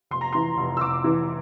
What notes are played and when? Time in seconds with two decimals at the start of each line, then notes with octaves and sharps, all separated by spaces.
0.11 F1 C6
0.21 A#5
0.33 E3 C6
0.57 F1
0.77 E6
0.81 F1 D6
1.04 E3